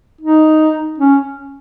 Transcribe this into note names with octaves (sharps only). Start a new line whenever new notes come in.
D#4
C#4